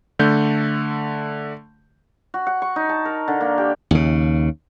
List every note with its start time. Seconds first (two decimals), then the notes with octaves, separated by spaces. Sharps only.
0.19 D3 A3 G6
2.34 F#4
2.47 F#5
2.62 C#6
2.76 D#4
2.89 A5
3.05 A#4
3.28 D3
3.41 A#3
3.58 G4
3.91 D#2 C#3